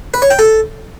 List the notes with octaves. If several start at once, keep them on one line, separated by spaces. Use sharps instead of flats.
B4
C#5
G5
A4